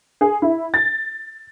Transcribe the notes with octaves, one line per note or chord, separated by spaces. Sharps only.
G#4
E4
A6